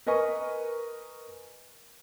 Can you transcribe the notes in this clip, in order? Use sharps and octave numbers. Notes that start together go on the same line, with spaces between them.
A#4 B4 D#5 G#5 C#6